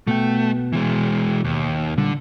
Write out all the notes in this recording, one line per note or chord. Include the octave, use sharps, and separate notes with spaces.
B2 A3 B3 G5
E3 G#3
D#2
A#2 D3 G3